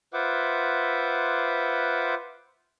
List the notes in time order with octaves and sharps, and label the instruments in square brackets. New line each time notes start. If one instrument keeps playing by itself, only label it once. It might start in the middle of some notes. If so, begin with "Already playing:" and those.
[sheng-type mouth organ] F4 B4 C5 E5 F#5 D6